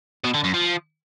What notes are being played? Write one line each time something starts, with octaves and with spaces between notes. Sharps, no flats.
B2
D3
F#2
F3